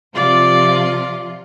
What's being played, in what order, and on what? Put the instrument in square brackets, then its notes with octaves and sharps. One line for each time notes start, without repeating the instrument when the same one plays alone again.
[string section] C3 F3 F4 [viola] D5